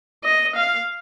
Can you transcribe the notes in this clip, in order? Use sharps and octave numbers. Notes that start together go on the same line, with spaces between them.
D#5
F5